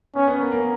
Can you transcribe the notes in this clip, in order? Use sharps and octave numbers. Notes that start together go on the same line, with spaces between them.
B3 C#4
B3
A#3
A#3